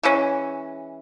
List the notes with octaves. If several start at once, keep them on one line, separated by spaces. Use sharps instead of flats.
E3 G#3 C#4